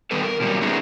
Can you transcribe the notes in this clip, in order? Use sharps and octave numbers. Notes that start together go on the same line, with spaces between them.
D#3 G3 B3 A4 B4
A#4
B2 D3 F#3 G3 A#3
A3 B3 C#4 D#4 G#4 A#4